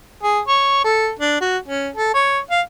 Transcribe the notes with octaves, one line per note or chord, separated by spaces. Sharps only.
G#4
C#5
A4
D4
F#4
C#4
A4
C#5
F5